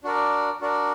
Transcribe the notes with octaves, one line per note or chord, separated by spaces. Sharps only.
D4 F#4 A#4 D5
D4 F#4 A#4 D5